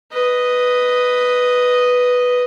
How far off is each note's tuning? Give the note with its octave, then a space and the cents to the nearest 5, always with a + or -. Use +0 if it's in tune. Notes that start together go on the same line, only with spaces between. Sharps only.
B4 +0 D#5 +0